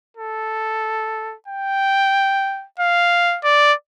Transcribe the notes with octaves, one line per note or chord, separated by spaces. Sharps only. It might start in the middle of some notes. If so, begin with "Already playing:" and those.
A4
G5
F5
D5